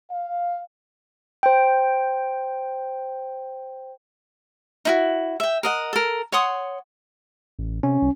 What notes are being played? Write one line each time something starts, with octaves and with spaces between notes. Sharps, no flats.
F5
C5 G5
D#4 E4 F#4
E5 G5
A#4 D#5 F#5
A4 A#4
C#5 F#5 C6 D#6
A1
C3 C#4
C2